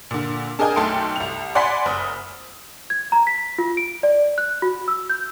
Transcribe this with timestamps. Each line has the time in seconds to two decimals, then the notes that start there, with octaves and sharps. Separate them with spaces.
0.11 A#2 D3
0.59 D4 G#4 A#4 D#5 G5 G#5
0.76 B1 A3 A4 G5 C6 D7
1.16 C2 F7
1.55 D5 F#5 G#5 B5 C6 B6
1.86 F#1 D#6
2.90 G#6
3.12 A#5
3.27 B6
3.58 F4
3.77 D7
4.03 D5
4.38 F#6
4.62 F#4
4.88 E6
5.10 G6